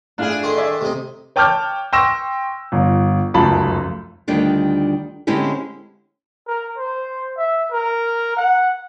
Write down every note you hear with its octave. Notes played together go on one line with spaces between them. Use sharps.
A2 D4 F4 G#4 F6
G#5
D#3 A3 C5
D5 E5 G#5
C3 A3 C4 D#4
C#5 G5 A5 D6 F6 G6
G5 C6 C#6 E6 A#6 E7
G1
F1 C#2 F#2 A5 B5
D2 D#3 G3 D4 F4
D3 G#3 C4 C#4 E4 G4
A#4
C5
E5
A#4
F#5